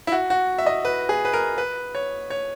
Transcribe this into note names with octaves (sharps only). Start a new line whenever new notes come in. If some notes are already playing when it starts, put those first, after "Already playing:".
E4
F#4
F#4
E5
D#5
B4
G#4
B4
A#4
B4
C#5
C#5